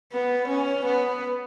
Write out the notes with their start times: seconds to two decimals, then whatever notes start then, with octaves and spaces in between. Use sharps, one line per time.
0.12 B3
0.48 C#4
0.86 B3